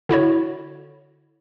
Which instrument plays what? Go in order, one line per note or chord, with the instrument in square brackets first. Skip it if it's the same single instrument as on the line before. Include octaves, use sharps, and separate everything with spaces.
[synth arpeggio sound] D3 E4 F#4 C#5